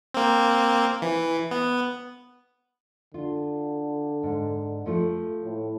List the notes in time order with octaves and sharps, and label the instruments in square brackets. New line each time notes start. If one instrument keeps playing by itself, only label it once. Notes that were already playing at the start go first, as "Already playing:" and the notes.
[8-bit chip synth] A#3 C4
E3
B3
[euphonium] D3 [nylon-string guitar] F4
[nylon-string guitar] G#2
F3 A3 F4
[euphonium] A2